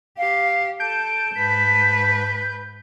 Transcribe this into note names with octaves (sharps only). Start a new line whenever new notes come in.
G4 F5
A4 A5 G6 D7
G#2 B4 B6